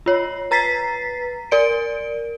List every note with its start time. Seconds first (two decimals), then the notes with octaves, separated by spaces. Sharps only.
0.06 F4 C#5
0.51 B4 A#5 A6 B6 C7
1.51 A#4 D5 D7